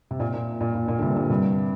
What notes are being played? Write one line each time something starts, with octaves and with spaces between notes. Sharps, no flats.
C3
A#2
A#2
A#2
A#2
A#2
D3
G2 C3
G2 C3
G2 C3